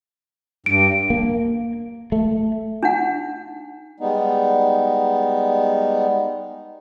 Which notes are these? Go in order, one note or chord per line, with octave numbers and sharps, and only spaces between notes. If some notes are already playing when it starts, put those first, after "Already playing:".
G2 D7
A#3
A3
D4 D#4 F#5
G3 G#3 B3 D#4